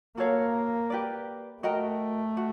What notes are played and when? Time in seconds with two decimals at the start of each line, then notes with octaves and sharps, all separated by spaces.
0.17 A#3 F#4 A4 C#5 F5
0.90 G4 B4 D5
1.63 A3 F#4 A#4 D#5 G5
2.37 F#4